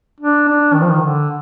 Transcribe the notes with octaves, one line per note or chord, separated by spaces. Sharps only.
D4
D4
D#3
F3
D#3
D3